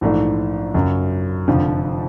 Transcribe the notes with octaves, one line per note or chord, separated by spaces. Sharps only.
A#1 G#2 E3 A3 D4
F#2 C#3 F#3
F1 F2 D3 F3